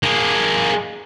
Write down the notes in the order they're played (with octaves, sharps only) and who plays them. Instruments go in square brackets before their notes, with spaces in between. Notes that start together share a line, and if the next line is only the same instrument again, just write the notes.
[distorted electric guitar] A#3 G#4